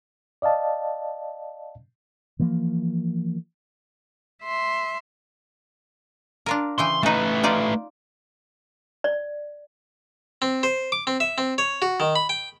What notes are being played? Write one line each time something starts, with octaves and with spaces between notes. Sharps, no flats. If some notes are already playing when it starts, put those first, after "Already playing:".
D5 D#5 F5 A5
E3 F3 A#3
E5 C6
D4 F4 A#4
C#3 E3 G5 C6
C#3 A3 D#4 B4
D#4 F4 D5
D5
C4
C5
D6
C4
E5
C4
C#5
F#4
D#3
B5
G5